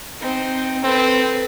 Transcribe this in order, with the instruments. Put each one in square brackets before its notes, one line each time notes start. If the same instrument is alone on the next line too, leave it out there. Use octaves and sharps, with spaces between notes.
[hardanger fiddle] C4 D#4
[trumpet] C4 [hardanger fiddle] A4 B4